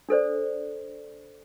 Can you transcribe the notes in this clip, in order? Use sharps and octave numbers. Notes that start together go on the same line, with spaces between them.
D4 A4 C5 D5